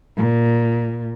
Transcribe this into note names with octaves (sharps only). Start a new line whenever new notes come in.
A#2